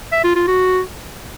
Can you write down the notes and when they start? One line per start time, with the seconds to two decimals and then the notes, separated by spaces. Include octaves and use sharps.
0.12 E5
0.24 F4
0.36 F4
0.47 F#4